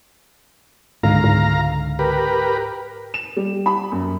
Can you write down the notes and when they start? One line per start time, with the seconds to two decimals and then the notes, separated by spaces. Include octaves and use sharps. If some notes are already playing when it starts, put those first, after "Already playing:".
1.03 C#2 G#2 D3 G#3 F5 A#5
1.24 G#2
1.99 G4 A#4 B4
3.14 E7
3.36 G3
3.66 B5
3.92 F#2